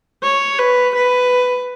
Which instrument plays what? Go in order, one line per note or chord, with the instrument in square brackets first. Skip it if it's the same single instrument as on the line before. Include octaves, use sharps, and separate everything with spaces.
[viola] C#5
B4
B4